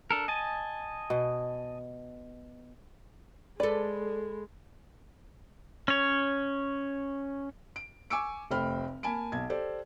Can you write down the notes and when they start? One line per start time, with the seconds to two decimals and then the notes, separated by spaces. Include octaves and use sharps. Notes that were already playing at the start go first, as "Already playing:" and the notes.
0.11 D4 A4 A#4
0.28 D#5 G#5 A5
1.10 B2
3.60 G#3 A4 B4 D5
5.88 C#4 C#5
7.76 D7
8.10 G#5 C#6 D6 E6 C#7 D7
8.51 F1 A3 C5 G5 B5 F6
9.03 A#3 G#5 A5 B5 D7
9.32 B1 A5 G#6
9.50 G4 A4 C5 D5